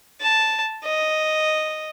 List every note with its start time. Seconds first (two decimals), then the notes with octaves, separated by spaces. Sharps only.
0.21 A5
0.84 D#5